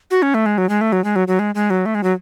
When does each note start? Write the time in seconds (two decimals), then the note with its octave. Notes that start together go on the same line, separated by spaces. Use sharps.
0.11 F#4
0.22 C#4
0.34 A3
0.46 G#3
0.58 F#3
0.69 G#3
0.81 A3
0.92 F#3
1.04 G#3
1.16 F#3
1.28 F#3
1.39 G#3
1.55 G#3
1.70 F#3
1.86 A3
1.95 G#3
2.03 F#3